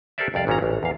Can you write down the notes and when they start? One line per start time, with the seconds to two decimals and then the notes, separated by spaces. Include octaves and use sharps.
0.18 G4 A4 A#4 C5 D5 E5
0.34 C2 F2 D5 F5
0.47 G#1 A#2 C#4 A4 A#5
0.62 A1
0.83 E2 A#2 F5